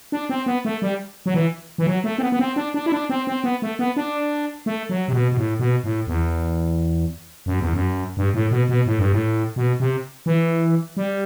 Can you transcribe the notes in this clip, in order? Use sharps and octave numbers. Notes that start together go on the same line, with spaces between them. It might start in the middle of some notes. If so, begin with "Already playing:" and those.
D4
C4
B3
A3
G3
F#3
E3
E3
F#3
A3
C4
B3
B3
C4
D4
D4
E4
D4
C4
C4
B3
A3
B3
D4
A3
F#3
C3
B2
B2
A2
B2
A2
E2
F#2
E2
F#2
G2
A2
B2
B2
A2
G2
A2
B2
C3
E3
G3